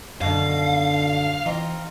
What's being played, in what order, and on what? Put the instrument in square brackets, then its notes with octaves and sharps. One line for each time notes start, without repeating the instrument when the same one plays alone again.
[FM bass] F#2 [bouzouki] B2 D#3 [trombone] D3 [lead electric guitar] F5
[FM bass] E3 [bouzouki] C4 D#4 F4